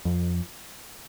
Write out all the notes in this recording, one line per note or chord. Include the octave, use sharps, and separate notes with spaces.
F2